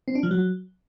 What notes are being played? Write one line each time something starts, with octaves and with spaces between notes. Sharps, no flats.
C4
D4
F3
F#3